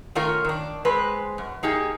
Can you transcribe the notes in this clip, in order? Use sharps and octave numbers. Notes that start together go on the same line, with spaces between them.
D#3 A3 C#4 F4 A#4
D#3 D4
G#3 C4 B4
F#2
A#3 D#4 G4 G#4